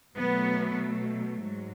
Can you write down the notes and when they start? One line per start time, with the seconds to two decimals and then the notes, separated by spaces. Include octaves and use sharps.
0.15 B2 F#3 A3 B3
1.43 G#2 F#3